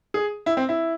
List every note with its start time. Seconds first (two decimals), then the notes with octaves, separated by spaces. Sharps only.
0.14 G#4
0.46 E4
0.57 C4
0.69 E4